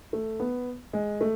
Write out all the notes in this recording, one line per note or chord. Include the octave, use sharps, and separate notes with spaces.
A3
B3
G#3
A3